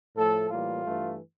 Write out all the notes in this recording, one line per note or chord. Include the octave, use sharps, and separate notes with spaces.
A2 F3 A3 A4
A2 E3 G3 A#3 F4
G2 E3 A3